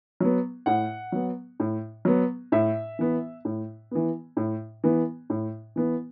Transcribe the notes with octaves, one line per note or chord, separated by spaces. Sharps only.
F#3 B3
A2 F#5
F#3 B3
A2
F#3 B3
A2 E5
E3 B3
A2
E3 B3
A2
E3 B3
A2
E3 B3